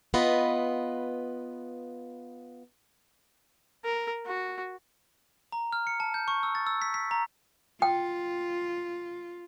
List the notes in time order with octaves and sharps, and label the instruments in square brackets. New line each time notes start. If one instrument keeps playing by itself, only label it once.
[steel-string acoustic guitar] B3 F4 B4 D#5
[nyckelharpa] A#4
F#4
[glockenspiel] A#5
F6
C#7
A5
G6
C#6
E6
A6
E6
B6
B6
A#5
[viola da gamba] F4 [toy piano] G5